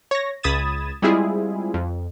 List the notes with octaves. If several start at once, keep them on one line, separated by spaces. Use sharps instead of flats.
C#5 A#6
C#2 B5 D#6 G#6 A6 E7
G3 G#3 C4 E4 F4 G#4
F2